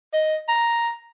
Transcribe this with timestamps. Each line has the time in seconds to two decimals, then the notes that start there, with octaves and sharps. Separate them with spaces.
0.13 D#5
0.48 A#5